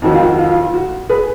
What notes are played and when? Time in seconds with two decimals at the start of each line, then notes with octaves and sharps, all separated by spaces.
0.02 F2 D#3 F#3 F#4
0.14 F4
0.26 F#4
0.38 F4
0.50 F4
0.61 F4
0.74 F#4
1.09 G#4 B4